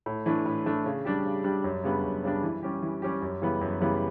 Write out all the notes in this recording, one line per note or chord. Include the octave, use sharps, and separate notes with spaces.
A2
E3 A3 D4
A2
E3 A3 D4
C#3
G3 D4 G4
C#3
G3 D4 G4
F#2
C#3 G3 B3 D4
F#2
C#3 G3 B3 D4
E3
G3 C#4 G4
E3
G3 C#4 G4
F#2
C#3 E3 G3 B3
F#2
C#3 E3 G3 B3